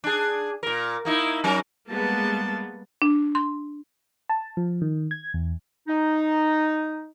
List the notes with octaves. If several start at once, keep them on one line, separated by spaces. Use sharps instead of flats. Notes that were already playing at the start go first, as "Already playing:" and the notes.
D4 G#4
A#2 A#4
A#3 D#4 E4
F#3 C#4 A#4
G3 G#3 A#3 B3 A5
D4
C6
A5
F3
D#3
G#6
E2
D#4